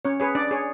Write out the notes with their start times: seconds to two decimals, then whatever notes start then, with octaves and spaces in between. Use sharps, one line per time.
0.05 C#4 C#5
0.20 G#4 B4 C#5
0.35 D4 D5
0.51 G#4 C#5